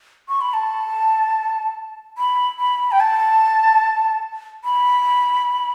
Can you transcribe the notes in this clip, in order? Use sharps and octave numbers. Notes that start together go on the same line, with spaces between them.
C#6
B5
A5
B5
B5
G5
A5
B5